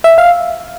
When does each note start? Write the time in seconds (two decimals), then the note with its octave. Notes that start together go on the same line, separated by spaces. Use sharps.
0.04 E5
0.18 F5